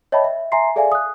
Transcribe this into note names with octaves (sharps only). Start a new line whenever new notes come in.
C#5 D#5 E5 G5 A5 B5
E5
E5 G#5 A#5 C6 C7
G#4 A4 D5 E5 F5 G#5
D#6 F#6